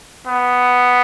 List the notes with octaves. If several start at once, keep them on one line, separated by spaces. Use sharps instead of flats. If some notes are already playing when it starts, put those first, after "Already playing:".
B3